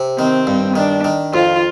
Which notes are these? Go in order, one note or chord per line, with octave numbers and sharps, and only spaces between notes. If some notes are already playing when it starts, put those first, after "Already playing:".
Already playing: C3
D#3 C4
G2
D#3 D4
D#3
F2 F4